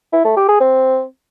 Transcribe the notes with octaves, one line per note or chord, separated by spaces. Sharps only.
E4
A3
G4
G#4
C4